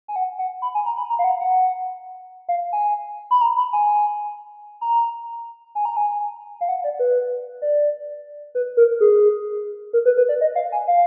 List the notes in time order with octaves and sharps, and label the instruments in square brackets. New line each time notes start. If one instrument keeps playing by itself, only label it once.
[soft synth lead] G#5
F#5
F#5
B5
G#5
A#5
B5
A#5
F5
F#5
F#5
F5
G#5
B5
A#5
B5
G#5
A#5
G#5
A#5
G#5
F5
F#5
D5
B4
D5
B4
A#4
G#4
A#4
B4
B4
D5
D#5
F5
G#5
F5